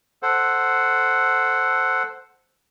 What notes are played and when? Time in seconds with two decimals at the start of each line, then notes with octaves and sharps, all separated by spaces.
0.23 A4 C5 F#5